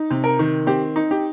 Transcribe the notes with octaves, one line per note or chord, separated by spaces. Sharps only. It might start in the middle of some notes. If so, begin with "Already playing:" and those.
Already playing: D#4
C3
A#4
D#3
C4 G4
D#4
G4